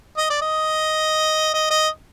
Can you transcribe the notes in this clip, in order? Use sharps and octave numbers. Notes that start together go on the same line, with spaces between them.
D#5
D5
D#5
D#5
D#5